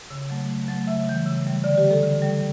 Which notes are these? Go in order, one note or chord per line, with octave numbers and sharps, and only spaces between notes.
C#3
F#3 A3
C#3
F#3 A3
C#3 E5
E3 G3
C#3
E3 G3
D3 D5
G4
G3
A4
D3
G3